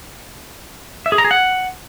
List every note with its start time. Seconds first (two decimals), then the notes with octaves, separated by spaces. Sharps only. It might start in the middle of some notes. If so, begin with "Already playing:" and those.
1.06 E5
1.12 G#4
1.18 A#5
1.25 G#4
1.31 F#5